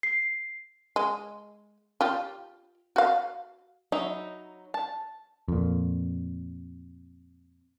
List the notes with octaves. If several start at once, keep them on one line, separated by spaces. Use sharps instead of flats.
C7
G#3
F4 G4
F#4 F5
F#3 D#4 E5 B5
A5
F2 A#2